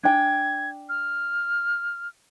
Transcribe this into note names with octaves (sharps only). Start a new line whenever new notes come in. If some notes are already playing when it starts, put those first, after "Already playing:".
D4 G5 G#5 G#6
F6